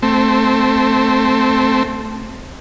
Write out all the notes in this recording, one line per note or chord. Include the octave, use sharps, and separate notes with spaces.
A3 C4